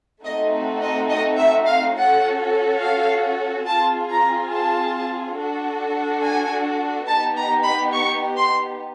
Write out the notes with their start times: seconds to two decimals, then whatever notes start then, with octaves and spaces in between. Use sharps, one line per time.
0.25 A3 C4 D#4 F#4 D#5
0.82 D#5
1.10 D#5
1.38 E5
1.67 F5
1.95 C#4 F#4 A4 F#5
2.81 F5
3.66 C4 F4 G#4 A5
4.09 A#5
4.51 A5
5.37 D4 F#4 A4
6.22 G#5
7.08 B3 D#4 G4 A5
7.36 A#5
7.65 B5
7.93 C#6
8.36 C6